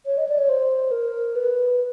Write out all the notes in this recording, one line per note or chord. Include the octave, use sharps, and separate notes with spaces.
C#5
D#5
D5
C#5
C5
A#4
B4